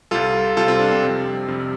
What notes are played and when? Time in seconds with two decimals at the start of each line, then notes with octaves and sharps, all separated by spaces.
0.11 C2 C3 G3 F4 A4
0.57 C2 C3 G3 F4 A4
0.68 C4 F4
0.79 D4
0.91 C4
1.02 F2 C3 G3
1.48 F2 C3 G3